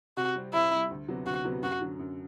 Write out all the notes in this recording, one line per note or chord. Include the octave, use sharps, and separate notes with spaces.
C3 F#4
G3 C4
C3 E4
G3 C4
D2
C3 F#3 B3 F#4
D2 F#4
C3 F#3 B3 F#4
F#2 F#4
D3 F#3
F#2